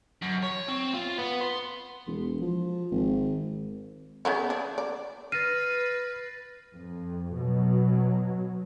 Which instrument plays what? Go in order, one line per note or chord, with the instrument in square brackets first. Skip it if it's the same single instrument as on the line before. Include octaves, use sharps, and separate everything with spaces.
[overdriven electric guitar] F#2
C#5
C4
F4
B3
C6
[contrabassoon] E1
F3
G#1
[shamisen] C#3 B3 E4
D4
D5
[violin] B4 [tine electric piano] F6 [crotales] A6 A#6 C7 [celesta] D#7
[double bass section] F2
B2 F#3